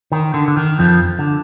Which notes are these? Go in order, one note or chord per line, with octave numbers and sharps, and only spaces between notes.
D#3
D3
D3
D#3
F2 F3
D3